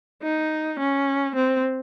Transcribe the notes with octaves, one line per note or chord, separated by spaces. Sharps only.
D#4
C#4
C4